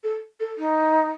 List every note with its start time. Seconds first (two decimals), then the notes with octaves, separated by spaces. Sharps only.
0.04 A4
0.40 A4
0.58 D#4